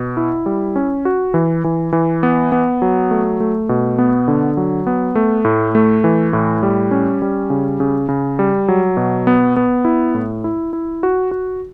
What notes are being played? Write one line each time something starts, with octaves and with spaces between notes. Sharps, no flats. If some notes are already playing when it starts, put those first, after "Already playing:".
Already playing: B2
E4
G3
C#4
F#4
E3
E3
E3
B3
B3
F#3
A3
A3
B2
B3
D3
F#3
B3
A3
A2
A3
E3
A2
G3
C#4
G3
C#3
C#3
C#3
G3
F#3
B2
B3
B3
E4
A2
E4
E4
F#4
F#4